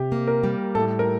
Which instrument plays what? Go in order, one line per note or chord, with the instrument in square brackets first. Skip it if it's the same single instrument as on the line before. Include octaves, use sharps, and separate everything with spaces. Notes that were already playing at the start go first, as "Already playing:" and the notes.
Already playing: [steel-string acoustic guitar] C3 [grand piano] G4
[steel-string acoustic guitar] A#3
[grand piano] A#4
[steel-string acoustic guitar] G3
[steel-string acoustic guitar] A2 [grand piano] A4
[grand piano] A#4